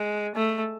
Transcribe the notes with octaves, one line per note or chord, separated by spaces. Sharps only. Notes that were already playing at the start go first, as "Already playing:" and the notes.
Already playing: G#3
A3